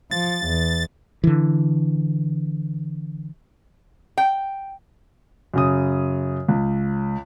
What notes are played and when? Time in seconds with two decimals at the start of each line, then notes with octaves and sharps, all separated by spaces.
0.11 F3 A6
0.46 E2
1.24 D3 E3
4.17 G5
5.54 F#2 C#3 D#6
6.48 C#2